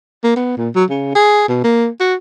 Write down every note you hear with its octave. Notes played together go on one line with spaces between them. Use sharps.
A#3
B3
A#2
F#3
C#3
G#4
B2
A#3
F#4